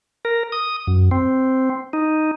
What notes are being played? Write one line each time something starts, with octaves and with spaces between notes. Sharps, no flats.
A#4
D#6
F#2
C4
D#4